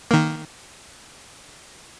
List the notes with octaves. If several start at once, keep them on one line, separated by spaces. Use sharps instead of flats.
D#3 A#3